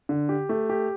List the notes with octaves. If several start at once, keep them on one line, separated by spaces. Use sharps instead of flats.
D3
G4
A3
G4